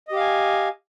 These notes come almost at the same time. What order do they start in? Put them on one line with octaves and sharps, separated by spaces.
D#5 G4 F5 G#5